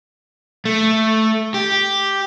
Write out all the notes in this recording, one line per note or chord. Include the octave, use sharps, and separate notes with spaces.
A3
G4